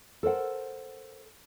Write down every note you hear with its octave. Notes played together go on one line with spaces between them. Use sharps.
A4 A#4 C5 F#5